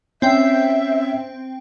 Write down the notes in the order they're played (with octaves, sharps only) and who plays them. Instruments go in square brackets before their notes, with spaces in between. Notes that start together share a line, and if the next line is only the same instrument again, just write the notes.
[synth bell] C4 G5 [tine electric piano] C#4 [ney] E5